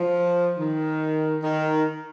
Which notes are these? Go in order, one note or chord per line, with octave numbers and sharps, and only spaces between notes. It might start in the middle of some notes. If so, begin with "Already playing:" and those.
Already playing: F3
D#3
D#3